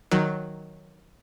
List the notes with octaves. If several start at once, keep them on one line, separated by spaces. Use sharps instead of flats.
D#3 F#3